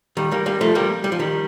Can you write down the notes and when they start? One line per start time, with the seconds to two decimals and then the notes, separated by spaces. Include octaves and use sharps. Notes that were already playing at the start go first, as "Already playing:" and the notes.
0.17 D#3 G3
0.32 G3 A#3
0.46 G3 A#3
0.61 F3 A3
0.75 G3 A#3
1.04 G3
1.12 F3
1.19 D#3 G3